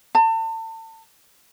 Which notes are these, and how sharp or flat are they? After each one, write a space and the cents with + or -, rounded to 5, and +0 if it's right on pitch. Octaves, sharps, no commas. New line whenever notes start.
A5 +35